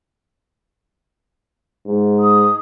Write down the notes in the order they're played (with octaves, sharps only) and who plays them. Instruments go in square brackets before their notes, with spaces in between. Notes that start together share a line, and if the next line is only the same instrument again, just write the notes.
[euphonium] G#2
[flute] D#6